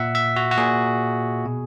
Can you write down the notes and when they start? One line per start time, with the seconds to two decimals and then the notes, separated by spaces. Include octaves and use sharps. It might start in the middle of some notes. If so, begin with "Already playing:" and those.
Already playing: A#2 E5 F#5
0.15 E5
0.36 F#4
0.51 F#4
0.58 A#2 G#4
1.45 B2